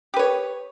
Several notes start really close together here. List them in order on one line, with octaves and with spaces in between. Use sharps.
G4 B4 C#5